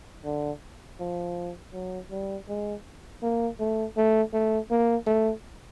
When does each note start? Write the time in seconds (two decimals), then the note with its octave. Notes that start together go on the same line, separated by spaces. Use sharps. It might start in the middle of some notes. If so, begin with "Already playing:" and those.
0.25 D3
1.00 F3
1.73 F#3
2.11 G3
2.49 G#3
3.23 A#3
3.60 A3
3.97 A3
4.33 A3
4.70 A#3
5.07 A3